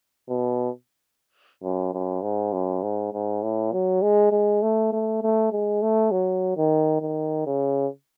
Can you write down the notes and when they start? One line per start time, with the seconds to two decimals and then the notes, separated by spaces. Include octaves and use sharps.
0.29 B2
1.63 F#2
1.94 F#2
2.22 G#2
2.53 F#2
2.83 G#2
3.13 G#2
3.43 A2
3.72 F#3
4.02 G#3
4.32 G#3
4.62 A3
4.93 A3
5.22 A3
5.52 G#3
5.82 A3
6.12 F#3
6.57 D#3
7.02 D#3
7.47 C#3